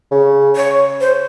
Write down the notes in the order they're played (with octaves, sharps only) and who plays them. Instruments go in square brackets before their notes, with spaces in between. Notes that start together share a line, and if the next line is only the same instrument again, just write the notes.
[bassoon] C#3
[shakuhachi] C#5
C5